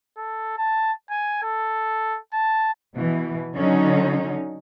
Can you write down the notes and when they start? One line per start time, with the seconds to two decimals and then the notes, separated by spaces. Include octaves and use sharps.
0.17 A4
0.58 A5
1.10 G#5
1.43 A4
2.33 A5
2.94 B2 E3
3.55 D3 F#3 C#4 D#4